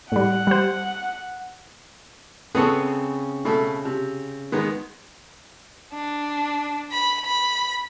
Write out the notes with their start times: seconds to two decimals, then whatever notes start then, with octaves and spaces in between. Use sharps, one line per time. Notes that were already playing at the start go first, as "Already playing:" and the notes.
0.12 A2 G3 F#5
0.47 G3 C5
2.55 C#3 B3 C4 G#4 A4 C#6
3.45 B2 A3
3.85 C3
4.52 D#3 G#3 B3
5.94 D4
6.92 B5
7.25 B5